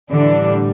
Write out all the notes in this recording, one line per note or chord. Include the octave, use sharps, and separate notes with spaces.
A2 D3 E3 G3 D4